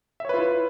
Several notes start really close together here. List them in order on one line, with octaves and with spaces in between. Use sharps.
E5 C#5 B4 F4 E4